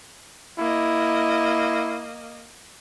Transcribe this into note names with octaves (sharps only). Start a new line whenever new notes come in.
A#3 E4 D#5